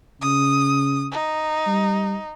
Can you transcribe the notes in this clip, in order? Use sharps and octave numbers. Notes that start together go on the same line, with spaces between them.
C#3 D#6
D#4
G3